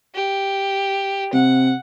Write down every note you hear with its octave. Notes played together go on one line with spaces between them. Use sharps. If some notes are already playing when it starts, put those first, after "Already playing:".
G4
C3 F#5